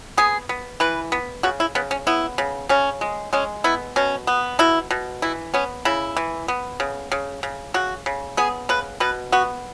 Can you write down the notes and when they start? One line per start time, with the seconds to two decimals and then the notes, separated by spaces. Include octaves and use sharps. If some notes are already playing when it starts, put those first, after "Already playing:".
0.17 B3 G#4
0.49 B3
0.80 E3 B4
1.12 B3
1.43 C#3 F#4
1.60 E4
1.75 C#3 B3
1.91 C#4
2.07 B3 E4
2.38 C#3
2.69 C#3 C#4
3.01 G#3
3.33 G#3 C#4
3.64 B3 E4
3.96 B2 C#4
4.27 B3
4.59 B2 E4
4.91 B2
5.22 E3 E4
5.54 B3 C#4
5.85 C#3 E4
6.17 E3
6.48 B3
6.80 C#3
7.12 C#3
7.43 C#3
7.74 C#3 F#4
8.06 C#3
8.37 B3 G#4
8.69 C#3 B4
9.00 B2 B4
9.32 B3 F#4